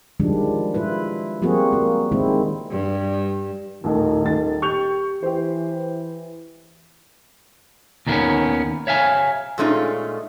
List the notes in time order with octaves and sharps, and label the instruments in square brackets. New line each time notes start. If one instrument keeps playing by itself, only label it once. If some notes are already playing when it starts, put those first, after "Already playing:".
[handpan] D#3 F3 G3 G#3 D4
E4 F4 B4
F3 G3 A#3 C4 F#4 G#4
A#3
D#3 G#3 C4 E4
[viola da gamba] G2
[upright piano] D#1 A1 [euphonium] D#3
[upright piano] D#1 A6 [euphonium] D#3
[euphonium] G4 [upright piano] C#6 G6 F7
[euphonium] E3 [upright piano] G4 C5
[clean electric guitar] D#2 D#3 G3 A#3 B3 C#4
C#5 E5 F5 G#5
[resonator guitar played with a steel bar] A#2 G#3 A3 C#4 D#4 F4